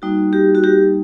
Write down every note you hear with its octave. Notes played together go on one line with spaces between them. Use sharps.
G3 A#3 D#4 F#4
G4
F#4
G4